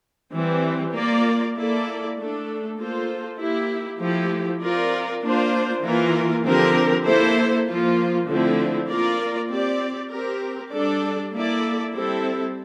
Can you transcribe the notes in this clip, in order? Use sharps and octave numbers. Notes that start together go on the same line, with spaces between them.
E3 G3 C4
A#3 F4 A#4 D5
A#3 E4 A4 D5
A3 D4 A4
A#3 F4 A4 C5
A#3 E4 G4
F3 A3 E4 G4
C4 F4 A#4 D5
A#3 D4 F4 C5
E3 A#3 F4 A#4
D3 F3 C4 G4 A#4
A#3 E4 A4 C5
F3 A#3 F4
D3 F3 A3 C4 E4
A#3 F4 A#4 D5
C4 G4 D5
C4 G4 A#4
G3 D4 A4 D5
A#3 E4 A4 D5
G3 C4 E4 A4